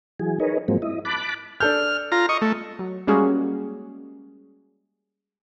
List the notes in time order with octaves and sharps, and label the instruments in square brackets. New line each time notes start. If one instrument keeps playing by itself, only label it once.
[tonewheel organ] E3 F#3 G#4
D#4 G#4 A#4 B4 C#5 D#5
G#2 F3 F#3 G#3 A#3 C4
E4 D#5
A5 B5 D6 F#6
[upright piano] D4 A4 G6 [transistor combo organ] F6
[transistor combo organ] F4 A#5
D#5 C#6
A3
[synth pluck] F#3
G3 G#3 A#3 C#4 F#4 G#4